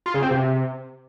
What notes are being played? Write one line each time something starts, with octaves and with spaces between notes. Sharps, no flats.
F4
C#3
C4
C3